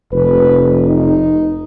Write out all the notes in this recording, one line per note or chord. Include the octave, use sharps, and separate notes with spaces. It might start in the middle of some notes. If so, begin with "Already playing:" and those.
F1 B4
D#4